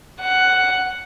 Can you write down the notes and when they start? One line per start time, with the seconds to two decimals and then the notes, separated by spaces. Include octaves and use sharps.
0.21 F#5